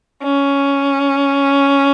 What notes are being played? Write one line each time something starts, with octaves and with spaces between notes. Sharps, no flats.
C#4